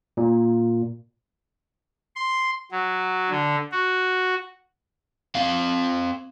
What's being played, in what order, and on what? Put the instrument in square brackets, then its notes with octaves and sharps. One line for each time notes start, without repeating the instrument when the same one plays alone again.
[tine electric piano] A#2
[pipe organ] C6
F#3
D3
F#4
[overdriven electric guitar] C4 F5